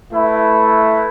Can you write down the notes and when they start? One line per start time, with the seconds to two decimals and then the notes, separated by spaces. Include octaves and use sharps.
0.13 A3 E4 B4